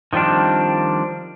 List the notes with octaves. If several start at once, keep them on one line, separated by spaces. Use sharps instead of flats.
D#3 F3 G3 C4 D4